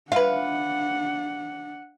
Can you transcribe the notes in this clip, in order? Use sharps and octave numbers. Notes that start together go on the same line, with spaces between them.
D4 F4 B4 F5 F#5